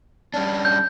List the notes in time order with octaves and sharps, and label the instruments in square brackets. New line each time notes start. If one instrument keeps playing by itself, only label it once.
[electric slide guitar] G3 C#4 D4
[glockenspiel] G6